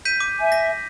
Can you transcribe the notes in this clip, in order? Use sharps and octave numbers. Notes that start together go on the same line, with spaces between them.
G6 B6 D#7
D6
E5 G#5
A#6 B6